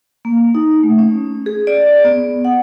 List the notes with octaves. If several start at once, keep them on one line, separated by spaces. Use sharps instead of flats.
A#3
D#4
A3
C#4
G#4
D5
B3
F#5